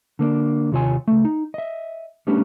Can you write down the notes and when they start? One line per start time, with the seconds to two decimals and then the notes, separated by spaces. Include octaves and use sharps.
0.19 D3 A#3 B3 D4
0.72 D#2 C3 F4 C#5 G#5
1.08 C#2 A3
1.25 D#4
1.54 D#5 E5
2.27 G3 A3 B3 C#4 D4 G4